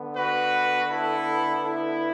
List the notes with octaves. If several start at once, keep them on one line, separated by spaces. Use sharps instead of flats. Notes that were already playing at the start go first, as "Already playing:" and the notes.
Already playing: D3 B3
F#4 B4
E4 A4
E4